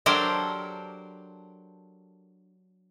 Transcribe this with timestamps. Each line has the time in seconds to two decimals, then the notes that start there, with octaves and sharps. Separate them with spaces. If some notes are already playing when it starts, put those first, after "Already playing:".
0.06 F#3 D4 G4 A4 A#4 C5